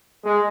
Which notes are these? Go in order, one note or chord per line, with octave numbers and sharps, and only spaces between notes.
G#3